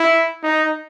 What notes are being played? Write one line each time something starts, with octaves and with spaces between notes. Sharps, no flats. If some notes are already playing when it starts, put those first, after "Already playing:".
Already playing: E4
D#4